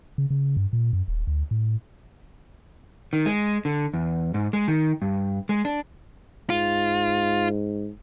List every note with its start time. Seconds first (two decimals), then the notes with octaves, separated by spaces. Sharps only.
0.18 C#3
0.30 C#3
0.57 G2
0.73 A#2
0.93 F#2
1.08 D#1
1.27 D2
1.51 A2
3.13 D#3
3.26 G#3
3.65 D3
3.94 E2
4.34 G#2
4.53 G#3
4.68 D#3
5.02 G2
5.49 G#3
5.65 D4
6.50 G#2 F4